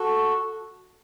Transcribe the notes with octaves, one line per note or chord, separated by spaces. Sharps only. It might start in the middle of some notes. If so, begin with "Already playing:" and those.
Already playing: F#4 A4